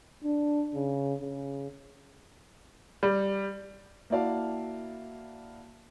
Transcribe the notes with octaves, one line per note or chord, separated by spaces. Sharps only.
D4
C#3
C#3
G3
A#3 E4 F#4 D5 F5 A5